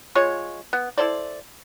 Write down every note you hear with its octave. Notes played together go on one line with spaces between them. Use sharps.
G#3 F4 C#5
B3
E4 A4 C5 D5